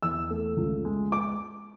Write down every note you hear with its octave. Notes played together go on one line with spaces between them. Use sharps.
E2 E6
A3
C#2
G#3
D6